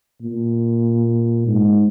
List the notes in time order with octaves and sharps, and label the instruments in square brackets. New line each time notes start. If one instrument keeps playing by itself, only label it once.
[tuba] A#2
G#2